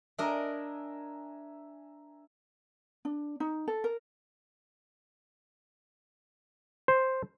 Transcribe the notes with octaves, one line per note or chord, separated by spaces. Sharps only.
D4 A#4 D#5 E5 G#5 A#5
D4
D#4
A4
A#4
C5